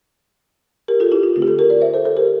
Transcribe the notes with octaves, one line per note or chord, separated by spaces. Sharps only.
G4 A#4
F4 A4
E4 G4
F4
D3 A3 C4 F4
G4
F4 A4
G4 A#4
A#4 D5
C5 E5
A4 C5
A4 C5
G4 A#4